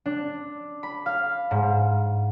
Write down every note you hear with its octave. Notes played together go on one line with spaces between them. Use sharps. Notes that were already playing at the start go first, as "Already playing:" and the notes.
D4
B5
F5
G#2